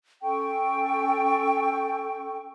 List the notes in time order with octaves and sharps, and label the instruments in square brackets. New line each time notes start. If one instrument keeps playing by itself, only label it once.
[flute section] C#4 A4 G5 C#6